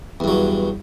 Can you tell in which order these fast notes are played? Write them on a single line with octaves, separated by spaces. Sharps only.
E2 G2 F#3